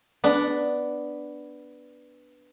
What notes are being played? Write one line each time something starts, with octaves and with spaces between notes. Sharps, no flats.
B3 D4